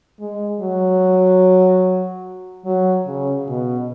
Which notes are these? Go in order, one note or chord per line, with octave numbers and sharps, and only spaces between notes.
G#3
F#3
F#3
C#3
B2